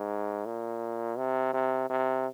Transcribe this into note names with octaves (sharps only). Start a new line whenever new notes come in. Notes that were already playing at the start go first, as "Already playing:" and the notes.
Already playing: G#2
A#2
C3
C3
C3